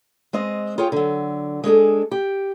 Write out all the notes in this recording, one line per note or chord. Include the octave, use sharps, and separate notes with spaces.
G#3 C4 D#5
F4 G#4 C#5 G5
D3 F#3
G#3 D4 G#4 A4
G4